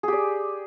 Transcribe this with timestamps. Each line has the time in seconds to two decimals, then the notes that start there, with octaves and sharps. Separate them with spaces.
0.03 G#4
0.08 G4
0.13 D5